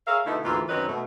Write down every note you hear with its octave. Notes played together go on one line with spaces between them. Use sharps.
G#4 A#4 C#5 E5 F5
B2 D3 A3 B3 D#4 E4
D2 G#2 E3 A#3 F4
F#2 D#3 C4 D#4 B4 C#5
B2 A3